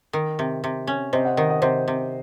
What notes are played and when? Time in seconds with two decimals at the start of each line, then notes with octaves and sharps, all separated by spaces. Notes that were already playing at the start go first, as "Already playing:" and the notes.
0.13 D#3
0.39 C3
0.64 C3
0.87 C#4
1.13 C3 C5 D#5
1.25 D#5 F#5
1.37 D#3 D#5 F#5
1.49 D#5 F#5
1.62 C3 C5 D#5
1.88 C3